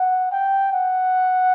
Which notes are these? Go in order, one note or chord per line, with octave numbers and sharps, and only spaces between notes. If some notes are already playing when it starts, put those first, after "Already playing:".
Already playing: F#5
G5
F#5